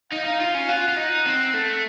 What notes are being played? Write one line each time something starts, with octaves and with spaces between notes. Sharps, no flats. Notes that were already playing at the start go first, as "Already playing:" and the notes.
D#4 F5
D#4
F4
C#4
F4 F#5
F4
D#4
C4
A3